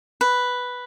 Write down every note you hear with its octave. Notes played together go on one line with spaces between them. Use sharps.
B4